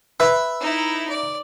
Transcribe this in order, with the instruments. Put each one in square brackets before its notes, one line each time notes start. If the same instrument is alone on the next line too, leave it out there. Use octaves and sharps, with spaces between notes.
[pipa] B4 [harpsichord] E5
[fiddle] D#4 E4
D5